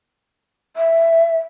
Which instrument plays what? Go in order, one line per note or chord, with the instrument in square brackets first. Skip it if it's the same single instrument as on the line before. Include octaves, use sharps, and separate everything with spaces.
[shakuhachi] E5